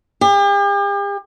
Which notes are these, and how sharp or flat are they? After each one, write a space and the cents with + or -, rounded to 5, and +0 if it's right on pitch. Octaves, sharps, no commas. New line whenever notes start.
G4 +45